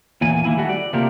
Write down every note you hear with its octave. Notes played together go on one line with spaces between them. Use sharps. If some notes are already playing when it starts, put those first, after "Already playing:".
E2 A#2 G#5
D#3 A#3 E4 G#5
G3 A3 F#4
D5
C3 A3 A#3 F4 G4 A#4